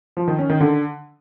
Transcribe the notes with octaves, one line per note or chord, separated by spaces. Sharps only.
F3
D#3
C#4
D#3
D3